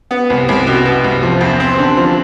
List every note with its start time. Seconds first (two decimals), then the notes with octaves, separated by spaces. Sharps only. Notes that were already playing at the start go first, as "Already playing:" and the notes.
0.11 B3
0.30 C2
0.49 C2
0.67 B2
0.85 B3
1.04 C2
1.23 F3
1.41 E2
1.60 C4
1.79 D3
1.97 F3